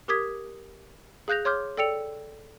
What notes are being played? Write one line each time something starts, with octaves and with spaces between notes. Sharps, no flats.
G4 A#4 D6 D#6 G#6 B6
G#4 F5 F#6 G6 A#6 F7
G#4 C#5 C6 D6 F6 G6
A4 D5 G5 E6 C#7 F7